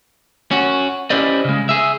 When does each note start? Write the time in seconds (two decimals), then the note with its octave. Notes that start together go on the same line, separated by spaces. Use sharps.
0.51 C#4 F#4
1.10 C#4 E4 G4 C5 D5 D#5
1.45 C#3 G#3
1.69 G#4 E5